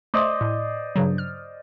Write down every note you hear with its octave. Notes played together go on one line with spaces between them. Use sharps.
A3 C5 D5 D#5
A2
G2 C#3 F#3
F6